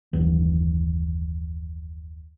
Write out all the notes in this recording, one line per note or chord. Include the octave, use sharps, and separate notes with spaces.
F#1 D#2 E3